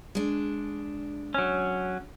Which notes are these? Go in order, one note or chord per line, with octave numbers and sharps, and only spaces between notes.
G#3 D4
F#3 C#4